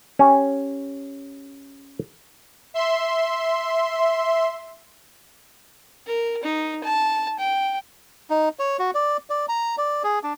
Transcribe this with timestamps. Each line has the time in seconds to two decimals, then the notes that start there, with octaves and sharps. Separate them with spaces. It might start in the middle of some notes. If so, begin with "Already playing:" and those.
0.19 C#4 G4
2.74 E5 C6
6.07 A#4
6.43 D#4
6.84 A5
7.39 G5
8.30 D#4
8.59 C#5
8.79 F#4
8.95 D5
9.30 D5
9.49 A#5
9.78 D5
10.03 G#4
10.23 D4